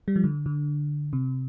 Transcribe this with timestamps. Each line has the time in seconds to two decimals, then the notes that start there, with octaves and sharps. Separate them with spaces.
0.08 G3
0.16 F3
0.24 D3
0.46 D3
1.13 C3